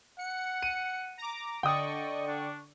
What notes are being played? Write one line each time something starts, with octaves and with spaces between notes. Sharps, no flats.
F#5 C#7
D#7
A#5 D6
D3 D5 D#5 G5 C#6 D#6
D4